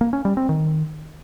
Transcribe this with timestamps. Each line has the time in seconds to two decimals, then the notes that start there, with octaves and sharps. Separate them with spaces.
0.01 A#3
0.13 C#4
0.25 G3
0.37 C4
0.49 D#3